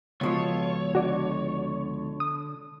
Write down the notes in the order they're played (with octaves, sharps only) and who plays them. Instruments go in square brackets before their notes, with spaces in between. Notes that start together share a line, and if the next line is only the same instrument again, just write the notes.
[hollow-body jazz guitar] C#2 B2 F3 [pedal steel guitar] F4 A4 [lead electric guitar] C#5
[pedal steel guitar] D3 [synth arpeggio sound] F#4 D5
[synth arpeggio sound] D#6